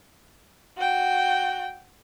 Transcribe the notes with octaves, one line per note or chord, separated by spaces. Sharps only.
F#4 G5